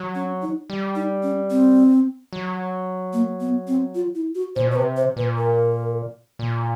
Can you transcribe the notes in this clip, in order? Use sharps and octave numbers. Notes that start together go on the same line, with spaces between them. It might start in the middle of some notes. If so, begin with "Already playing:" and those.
Already playing: F#3
C#4
D#4
G3
D#4
C#4
C4
F#3
A#3
B3
C4
F4
E4
F#4
A#2 C5
B2 C5
C3 B4
C5
A#2 B4
A#4
A#2